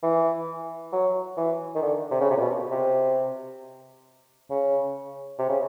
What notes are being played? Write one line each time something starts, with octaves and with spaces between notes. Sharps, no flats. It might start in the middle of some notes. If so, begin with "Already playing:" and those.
E3
F#3
E3
D#3
D3
C3
C#3
C3
A#2
B2
C3
C#3
C3
C#3